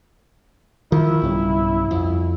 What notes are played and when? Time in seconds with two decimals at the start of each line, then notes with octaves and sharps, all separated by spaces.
0.92 D#3 F3 E4
1.22 B1 G2 C#3
1.91 F2